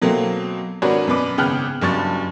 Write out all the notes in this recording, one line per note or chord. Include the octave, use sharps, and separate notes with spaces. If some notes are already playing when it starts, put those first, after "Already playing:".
B2 F#3 A3 A#3 C4
G#1 D4 F#4 A#4 B4 C#5
F#2 B2 B4 D6
G#1 C#3 B3 G5 F6 F#6
F#1 G2 F#3 C#6 A6